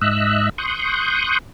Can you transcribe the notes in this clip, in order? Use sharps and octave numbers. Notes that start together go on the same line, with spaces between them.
G#2 D#5 E5 E6 F#6
C6 C#6 D#6 F#6 G6